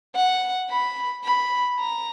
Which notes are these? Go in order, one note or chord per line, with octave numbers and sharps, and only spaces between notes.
F#5
B5
B5
A#5